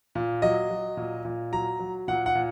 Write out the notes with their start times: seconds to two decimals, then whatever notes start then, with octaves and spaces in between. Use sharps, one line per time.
0.15 A#2
0.42 F#3 D#5
0.71 F#3
0.97 A#2
1.25 A#2
1.52 F#3 A#5
1.79 F#3
2.08 A#2 F#5
2.26 F#5
2.35 A#2